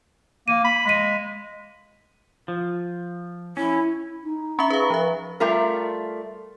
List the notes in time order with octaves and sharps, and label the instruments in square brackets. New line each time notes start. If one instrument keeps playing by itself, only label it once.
[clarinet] A#3 [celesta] F5 D#7
[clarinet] B5
[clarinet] G#3 [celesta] B6 D#7
[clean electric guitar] F3
[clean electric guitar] C#4 [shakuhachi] E4
[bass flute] D#4
[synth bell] C#4 E5 [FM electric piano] A#5 B5 C#6
[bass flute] G#4 [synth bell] B4 F5
[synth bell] F3 E5 [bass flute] B4
[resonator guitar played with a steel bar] G3 A3 F4 A#4